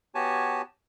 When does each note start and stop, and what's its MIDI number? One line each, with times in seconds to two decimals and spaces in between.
0.15 0.62 59
0.15 0.62 66
0.15 0.62 67
0.15 0.62 73
0.15 0.62 80
0.15 0.62 81